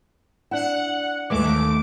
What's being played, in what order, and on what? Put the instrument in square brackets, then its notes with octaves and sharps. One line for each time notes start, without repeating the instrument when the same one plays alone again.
[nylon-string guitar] D4 E4 [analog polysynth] F#5
[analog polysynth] D#2 D6 [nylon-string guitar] E3 G#3 A3
[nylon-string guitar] A3